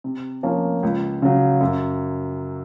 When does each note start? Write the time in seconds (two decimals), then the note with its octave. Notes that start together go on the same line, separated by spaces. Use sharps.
0.04 C3
0.43 F3 A#3 C#4
0.83 C#2
1.22 C#3 F#3
1.60 F#2